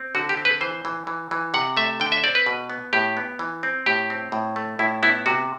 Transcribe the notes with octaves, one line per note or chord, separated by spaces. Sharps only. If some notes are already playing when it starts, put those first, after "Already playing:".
Already playing: C4
D3 F#4
G4
C4
B4
E3 C5
E3
E3
E3
C3 F#5
A3 E5
D3 G5
E5
C4 D5
B4
B2
B3
A2 G4
B3
E3
C4
A2 G4
C4
A2
A3
A2 E4
B3 E4
C3 F#4